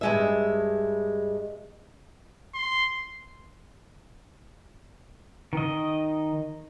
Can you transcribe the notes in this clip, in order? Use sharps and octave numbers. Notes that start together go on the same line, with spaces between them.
G2 G#3 E5
C6
D#3 D#5